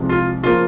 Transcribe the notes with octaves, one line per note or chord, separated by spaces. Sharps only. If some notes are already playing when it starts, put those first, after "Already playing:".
Already playing: C2 C3 F3 G#3
F4
C#3 F3 A#3 F4